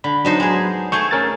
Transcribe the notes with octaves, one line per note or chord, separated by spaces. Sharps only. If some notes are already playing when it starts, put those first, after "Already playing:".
D3 B5
F#3 B3 D4 D#4 C5
G#3 G#4
A3 G#4 A4 C#6 G6
C#4 A#4 A6